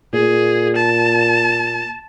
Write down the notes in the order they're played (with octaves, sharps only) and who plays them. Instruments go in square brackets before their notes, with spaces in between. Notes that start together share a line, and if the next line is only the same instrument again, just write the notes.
[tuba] A#2 [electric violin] G#4
[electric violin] A5